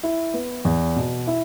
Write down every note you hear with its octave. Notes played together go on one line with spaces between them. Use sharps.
E4
B3
E2
B2
E4